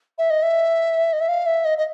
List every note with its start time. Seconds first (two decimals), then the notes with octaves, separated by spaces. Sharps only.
0.18 E5
0.30 D#5
0.42 E5
1.13 D#5
1.21 E5
1.28 F5
1.46 E5
1.65 D#5
1.78 D#5